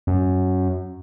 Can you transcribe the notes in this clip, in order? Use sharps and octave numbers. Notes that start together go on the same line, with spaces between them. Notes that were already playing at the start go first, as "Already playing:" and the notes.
F#2